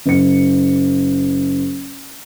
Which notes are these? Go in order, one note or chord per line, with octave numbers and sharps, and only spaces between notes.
F#1 C#7